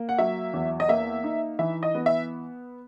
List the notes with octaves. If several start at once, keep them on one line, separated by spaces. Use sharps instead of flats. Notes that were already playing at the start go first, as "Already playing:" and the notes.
Already playing: A#3
F#5
F#3 E5
E2
D#5
A#3 E5
D#4
E3 E5
D#5
B3
E5